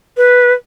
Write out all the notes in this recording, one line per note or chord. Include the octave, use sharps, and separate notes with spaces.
B4